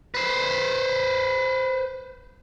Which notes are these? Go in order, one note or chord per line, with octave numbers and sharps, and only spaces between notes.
B4 C5